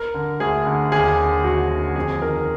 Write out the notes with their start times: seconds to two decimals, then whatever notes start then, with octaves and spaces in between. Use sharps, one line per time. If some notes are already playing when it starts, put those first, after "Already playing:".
Already playing: A#4
0.14 D3
0.40 D2 G#4
0.66 D3
0.92 D#2 G#4
1.18 D3
1.44 D#2 F#4
1.70 D3
1.96 F2 G#4
2.22 D#3 A#4